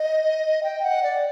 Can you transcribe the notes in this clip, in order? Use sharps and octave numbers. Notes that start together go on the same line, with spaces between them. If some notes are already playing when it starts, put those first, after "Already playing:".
Already playing: D#5
G5
F#5
D5